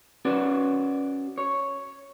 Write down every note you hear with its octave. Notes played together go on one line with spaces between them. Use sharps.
C#4 F#4 B4 D5
C#5